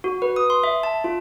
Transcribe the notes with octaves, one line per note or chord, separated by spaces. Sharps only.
F#4
B4
D#6
C6
E5
A5
F4